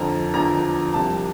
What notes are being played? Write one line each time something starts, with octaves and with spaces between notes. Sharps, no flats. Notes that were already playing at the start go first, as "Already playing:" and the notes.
Already playing: F2 D3 F3 A#5
E2 D3 F3 A#5
C2 C3 F3 A5